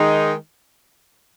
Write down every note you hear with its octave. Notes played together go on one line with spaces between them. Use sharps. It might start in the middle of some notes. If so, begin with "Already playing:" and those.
Already playing: D#3 G#3 D#4